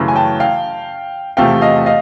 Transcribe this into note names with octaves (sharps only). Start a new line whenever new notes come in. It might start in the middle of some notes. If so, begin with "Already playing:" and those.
Already playing: F#2 C#3 E3 A3
G#5
G5 A5
F5 G5
E2 C3 F3 A3 C4 F5 G5
D#5 F5
D#5 F5